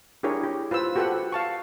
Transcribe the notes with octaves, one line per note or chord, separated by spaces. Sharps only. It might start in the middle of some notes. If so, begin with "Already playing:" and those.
D4 E4 G4 G#4 A#4 C#5
G4
F4 B4 C5 E6
F#4 G4 A4 B4 C5 F#5
F5 A5 C#6